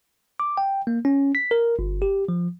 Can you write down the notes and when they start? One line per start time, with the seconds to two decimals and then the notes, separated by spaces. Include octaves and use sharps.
0.40 D6
0.57 G5
0.87 A#3
1.05 C#4
1.35 B6
1.51 A#4
1.79 G1
2.02 G4
2.29 F3